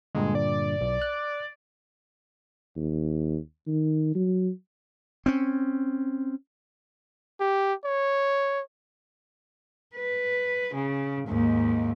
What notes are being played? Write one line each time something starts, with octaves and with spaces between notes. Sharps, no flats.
G2 A#2 D3 G#3
D5
B1
F#6
D#2
D#3
F#3
C4 C#4
G4
C#5
B4
C#3
D#2 G#2